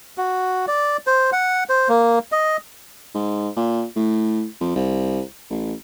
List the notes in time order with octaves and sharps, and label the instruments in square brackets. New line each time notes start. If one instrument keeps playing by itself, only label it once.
[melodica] F#4
D5
C5
F#5
C5
A#3
D#5
[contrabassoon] G#2
A#2
A2
F2
C2
A1